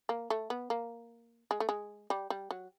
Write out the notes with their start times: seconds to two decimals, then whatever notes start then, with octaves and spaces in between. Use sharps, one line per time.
0.09 A#3
0.30 A3
0.50 B3
0.70 A#3
1.51 G#3
1.60 A3
1.69 G#3
2.10 G3
2.30 G3
2.51 F#3